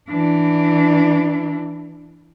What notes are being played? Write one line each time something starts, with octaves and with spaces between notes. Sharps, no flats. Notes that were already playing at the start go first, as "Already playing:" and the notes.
E3 D4